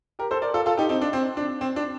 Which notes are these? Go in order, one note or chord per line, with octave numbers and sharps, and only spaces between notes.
G4 A#4
A4 C5
A#4 D5
F4 A4
F4 A4
D#4 G4
C4 D#4
D4
C4
D4
C4
D4